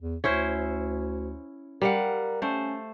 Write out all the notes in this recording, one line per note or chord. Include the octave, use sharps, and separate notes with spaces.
E2
D2 C#4 E4 C5
G3 A#4 F5 F#5
A3 C#4 C5